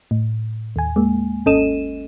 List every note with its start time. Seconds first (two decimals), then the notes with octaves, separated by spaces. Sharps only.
0.11 A2
0.76 D#2 G#5
0.96 G#3 A#3
1.46 G#1 C#4 A4 D#5 D#7 E7